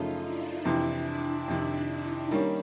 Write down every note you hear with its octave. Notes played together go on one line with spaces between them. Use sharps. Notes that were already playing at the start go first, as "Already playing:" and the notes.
Already playing: F#2 C#3 F3 A3 D#4 F4
D4 E4
F2 C3 E3 D4 E4
F2 C3 D#3
D#4
D#3 G3 A#3 C#4 D4